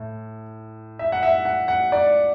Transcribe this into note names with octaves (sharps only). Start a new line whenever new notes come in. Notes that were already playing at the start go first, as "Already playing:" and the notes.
Already playing: A2
E5
F#5
E5
F#5
F#5
D5